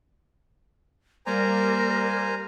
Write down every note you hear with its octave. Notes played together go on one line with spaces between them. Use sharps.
G3 A#3 A#4 C5 D5 G#5 A#5